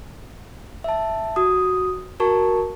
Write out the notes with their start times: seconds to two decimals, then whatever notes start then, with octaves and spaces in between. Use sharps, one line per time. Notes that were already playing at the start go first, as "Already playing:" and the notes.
0.84 E5 A5
1.36 F#4 D#6
2.20 F#4 A#4 A5 C#6